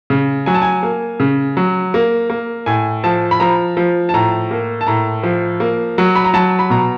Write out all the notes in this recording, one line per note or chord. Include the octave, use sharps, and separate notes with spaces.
C#3
F#3 G#5
A5
G#5
A#3
C#3
F#3
A#3
A#3
A2 G#5
F3 A5
B5
F3 A#5
F3
A5
A2 A#5
A#3
A5
A2 A#5
F3
A#3
F#3
B5
A#5
F#3 A5
B5
B2 A#5